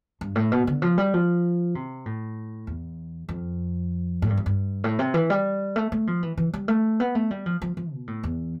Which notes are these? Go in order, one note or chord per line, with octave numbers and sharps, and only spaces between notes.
G2
A2
B2
D3
F3
G3
F3
C3
A2
E2
F2
A2
G2
F2
G2
A2
C3
E3
G3
A3
A3
F3
E3
E3
G3
A3
B3
A3
G3
F3
F3
F3
B2
A2
E2